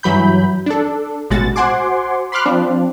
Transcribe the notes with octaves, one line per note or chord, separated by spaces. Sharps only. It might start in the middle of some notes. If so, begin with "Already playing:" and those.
G2 E3 F#3 B5 G6
D4 A4
A1 B2 G#3 F#4 A6
F#4 C5 F#5 G#5 C6 D6
B5 C6 D6 F6 F#6
F3 C4 D4